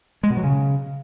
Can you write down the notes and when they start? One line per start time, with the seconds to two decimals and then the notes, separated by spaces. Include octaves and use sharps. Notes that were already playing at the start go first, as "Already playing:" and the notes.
0.23 G#3
0.30 B2
0.37 F#3
0.44 C#3